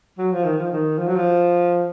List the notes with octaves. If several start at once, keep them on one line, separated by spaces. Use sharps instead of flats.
F#3
F3
D#3
F3
D#3
F3
F#3
F3